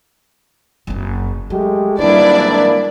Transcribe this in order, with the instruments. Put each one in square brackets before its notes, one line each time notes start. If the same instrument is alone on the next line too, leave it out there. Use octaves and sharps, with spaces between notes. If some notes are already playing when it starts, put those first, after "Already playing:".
[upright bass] F#1 C4
[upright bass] F#3 [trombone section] G#3 A3 G4
[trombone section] G#1 E3 A#3 [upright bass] F#3 G3 [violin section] D4 E4 D5